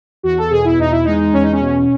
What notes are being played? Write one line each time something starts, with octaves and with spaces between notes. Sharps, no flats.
E2 F#4
A4
B2 G#4
E4
E2 D#4
E4
G#3 D#4
E2 C#4
D#4
C#4
B2